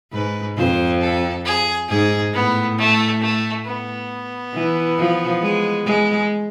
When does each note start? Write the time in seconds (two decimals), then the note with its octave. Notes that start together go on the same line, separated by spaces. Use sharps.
0.13 G#2 B4
0.57 F2 C5
1.01 A4
1.45 G#4
1.89 G#2 G#4
2.33 A2 B3
2.78 A3
3.21 A3
3.65 B3
4.54 E3
4.98 F3
5.42 G#3
5.86 G#3